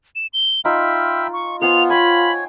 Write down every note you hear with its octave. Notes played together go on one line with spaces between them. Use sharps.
E7
G7
D#4 F4 E5 G5 B5 C6 F6
C#6
B3 F4 C5 F#5 G#5 F7
C#5 G5 G#5 B5